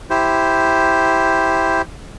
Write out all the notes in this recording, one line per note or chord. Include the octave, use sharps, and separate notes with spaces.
E4 G4 C5